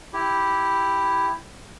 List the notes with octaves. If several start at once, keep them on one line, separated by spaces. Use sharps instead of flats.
E4 G4